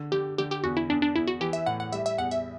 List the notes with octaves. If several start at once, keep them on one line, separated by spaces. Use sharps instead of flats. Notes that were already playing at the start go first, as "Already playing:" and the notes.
Already playing: D3
D3 G4
D3 G4
G4
E2 F#4
E4
E2 D4
D4
E2 E4
F#4
E3 G4
E5
A2 F#5
F#5
G3 E5
E5
E2 F#5
E5